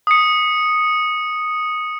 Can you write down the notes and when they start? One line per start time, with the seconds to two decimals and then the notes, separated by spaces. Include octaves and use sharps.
0.07 D#6 C#7